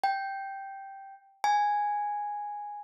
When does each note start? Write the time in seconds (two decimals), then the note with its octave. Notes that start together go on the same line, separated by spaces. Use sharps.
0.04 G5
1.44 G#5